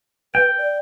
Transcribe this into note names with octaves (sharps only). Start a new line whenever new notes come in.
B4 G5
D5